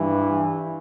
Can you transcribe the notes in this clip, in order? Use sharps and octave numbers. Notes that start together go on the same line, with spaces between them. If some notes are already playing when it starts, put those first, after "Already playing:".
Already playing: G2 E3